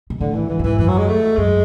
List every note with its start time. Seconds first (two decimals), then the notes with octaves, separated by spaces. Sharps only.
0.10 B2
0.20 A2 D3
0.35 E3
0.49 G#2 E3
0.59 A2
0.64 G#2 E3
0.78 F#2 E3
0.88 F#3
0.98 G#3
1.09 A3
1.37 F#2 G#3